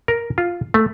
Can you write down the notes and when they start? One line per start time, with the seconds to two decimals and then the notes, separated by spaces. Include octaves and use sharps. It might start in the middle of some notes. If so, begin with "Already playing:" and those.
0.08 A#4
0.38 F4
0.74 A3